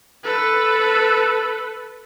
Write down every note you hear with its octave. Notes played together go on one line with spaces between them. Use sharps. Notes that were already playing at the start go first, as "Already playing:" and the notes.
A4 B4